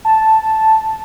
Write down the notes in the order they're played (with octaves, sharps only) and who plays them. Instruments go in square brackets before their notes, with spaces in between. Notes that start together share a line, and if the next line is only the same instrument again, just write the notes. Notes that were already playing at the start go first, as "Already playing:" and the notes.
[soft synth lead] A5